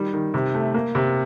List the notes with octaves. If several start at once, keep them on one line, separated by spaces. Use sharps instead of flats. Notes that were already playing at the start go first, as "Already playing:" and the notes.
Already playing: D#3 G3
D#3
C3
A3
A#3
C3